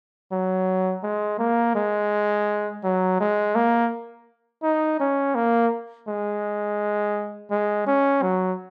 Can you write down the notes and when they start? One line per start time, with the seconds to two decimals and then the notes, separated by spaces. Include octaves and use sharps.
0.32 F#3
1.03 G#3
1.39 A#3
1.75 G#3
2.84 F#3
3.20 G#3
3.55 A#3
4.63 D#4
5.00 C#4
5.35 A#3
6.08 G#3
7.51 G#3
7.87 C#4
8.23 F#3